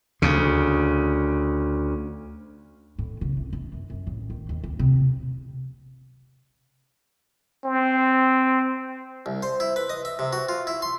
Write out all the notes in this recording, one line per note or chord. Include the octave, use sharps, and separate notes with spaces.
D2 C#3
A2
C#3
C2
D4
F#2
F#2
A1
D#3
D#2
D2
C3
C4
C2
C5
E4
B4
D#5
E5
C3
F#4
F4
E4
C6